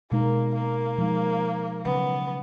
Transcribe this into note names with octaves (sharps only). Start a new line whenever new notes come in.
B2 G#3 A#3 D#4 A#4
A#3
F3 G#3 D#4
C#3 F#3 B3 C#4